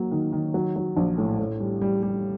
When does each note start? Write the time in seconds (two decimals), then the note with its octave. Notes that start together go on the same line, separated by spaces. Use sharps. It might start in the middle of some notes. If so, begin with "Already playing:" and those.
Already playing: F#3 A#3
0.11 D#3
0.32 D#3
0.54 F#3
0.76 F#3
0.97 A#1
1.18 A2
1.39 A2
1.60 G3
1.81 G3
2.03 G3